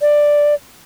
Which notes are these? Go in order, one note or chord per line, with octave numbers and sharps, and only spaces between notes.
D5